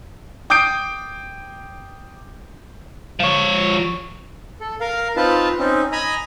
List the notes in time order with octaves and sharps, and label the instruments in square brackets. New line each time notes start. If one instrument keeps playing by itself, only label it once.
[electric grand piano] G5 D6 D#6 G6 C7 D7
[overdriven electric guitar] F3 C#5
[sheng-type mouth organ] A4
A#4 F5
C4 D#4 F4 B4 F5 A5
C4 C#4 D#4
D#5 G#5 A#5 B5 D#6